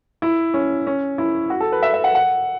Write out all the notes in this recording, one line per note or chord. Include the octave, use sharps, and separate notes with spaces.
E4
C#4
C#4
E4
F#4
A4
B4
E5
E5
F#5
F#5